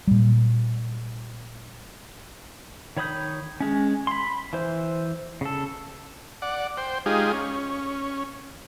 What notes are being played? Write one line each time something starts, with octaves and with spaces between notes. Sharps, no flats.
A#2 G3
D#3 C#5 B5 D#6 G6
G#3 C#4
B5 C6
E3 C5
C#3 A4
D5 F#5
C5 G5
G#3 D#4 F4 G4 G#4
C#4